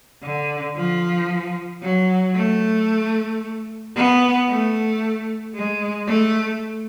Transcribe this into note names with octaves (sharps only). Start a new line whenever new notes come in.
D3
F3
F#3
A3
B3
A3
G#3
A3